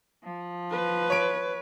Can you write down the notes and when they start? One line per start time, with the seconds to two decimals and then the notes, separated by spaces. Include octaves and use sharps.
0.22 F3
0.71 B4
1.10 C#5 D7